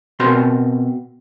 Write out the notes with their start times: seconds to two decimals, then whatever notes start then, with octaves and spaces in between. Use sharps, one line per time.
0.20 B2 C4 F#4 A#4 B5 C6